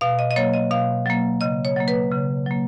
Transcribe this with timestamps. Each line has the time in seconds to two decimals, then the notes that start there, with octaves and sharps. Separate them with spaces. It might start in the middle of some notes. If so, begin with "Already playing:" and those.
0.01 B2 F5
0.19 D#5
0.31 D#5
0.36 F#3 A#3 C#5
0.53 D#5
0.71 B2 F5
1.06 F#3 A#3
1.41 C#3 D#5
1.65 C#5
1.76 F#3 A#3
1.88 B4
2.12 C#3
2.46 F#3 A#3